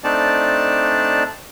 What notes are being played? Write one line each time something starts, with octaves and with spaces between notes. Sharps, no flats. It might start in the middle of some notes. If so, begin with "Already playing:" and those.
A3 C4 D4 D#4 D5 A5